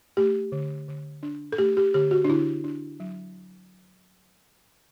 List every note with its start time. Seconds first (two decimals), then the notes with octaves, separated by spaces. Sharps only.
0.17 A3 G4
0.52 D3
0.88 D3
1.23 D4
1.52 A4
1.58 A3 G4
1.77 G4
1.94 D3 G4
2.11 F#4
2.24 D4
2.29 D3 E4
2.64 D4
3.00 F#3